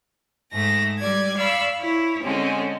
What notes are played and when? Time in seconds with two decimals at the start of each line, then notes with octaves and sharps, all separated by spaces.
0.53 G#2 A3 A#6
0.99 G3 D5 G#6
1.36 D5 F5 B5 C#6 E6
1.80 E4 C#5
2.23 D3 G#3 C4 C#4